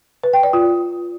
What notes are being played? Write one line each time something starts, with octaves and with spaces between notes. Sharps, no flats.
B4
G5
D5
F4